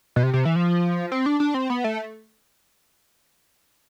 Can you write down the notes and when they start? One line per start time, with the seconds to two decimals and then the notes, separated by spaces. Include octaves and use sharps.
0.16 B2
0.23 C3
0.33 C3
0.45 E3
0.56 F3
1.12 C4
1.26 D4
1.40 D4
1.54 C4
1.70 B3
1.84 A3